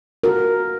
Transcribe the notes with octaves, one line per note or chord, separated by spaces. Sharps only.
F#4 A#4